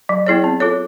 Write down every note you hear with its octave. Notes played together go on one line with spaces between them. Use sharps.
F#3
B3 E4 G#4 C#5
C4
F4 A4 C#5